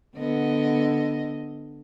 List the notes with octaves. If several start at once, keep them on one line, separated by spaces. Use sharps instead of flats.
D3 B3 D#5